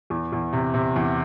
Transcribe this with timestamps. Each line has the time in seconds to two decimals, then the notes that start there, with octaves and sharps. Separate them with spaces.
0.10 E2
0.33 E2
0.53 C3
0.74 C3
0.96 E2